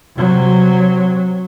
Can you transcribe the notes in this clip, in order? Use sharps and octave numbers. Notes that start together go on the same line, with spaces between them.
C3 F#3